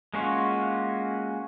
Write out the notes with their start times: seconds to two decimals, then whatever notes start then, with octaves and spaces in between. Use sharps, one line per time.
0.14 G#3 A#3 C#4 F4 F#4